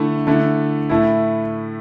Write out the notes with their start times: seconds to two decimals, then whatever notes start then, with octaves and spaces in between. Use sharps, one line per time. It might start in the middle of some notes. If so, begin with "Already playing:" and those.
Already playing: D3 A3 E4
0.27 D3 A3 E4
0.89 A2 A3 E4